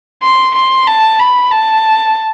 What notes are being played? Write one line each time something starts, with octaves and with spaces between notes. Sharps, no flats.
C6
C6
A5
B5
A5